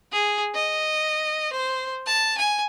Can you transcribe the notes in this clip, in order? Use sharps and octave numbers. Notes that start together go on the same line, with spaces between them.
G#4
D#5
C5
A5
G#5